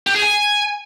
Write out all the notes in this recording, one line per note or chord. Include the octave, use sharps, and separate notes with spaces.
G4
G#4
G#5